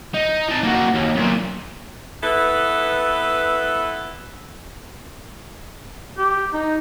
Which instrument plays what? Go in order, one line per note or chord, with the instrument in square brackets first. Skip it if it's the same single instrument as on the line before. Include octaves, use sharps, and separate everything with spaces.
[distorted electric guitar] D#4
D#4 A5
A#3 F#4
D#2
B1 A#2
[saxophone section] B3 E4 A4 B4
[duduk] G4
D#4